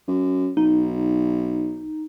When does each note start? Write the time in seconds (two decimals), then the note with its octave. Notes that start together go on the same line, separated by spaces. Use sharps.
0.08 F#2
0.57 B1 D#4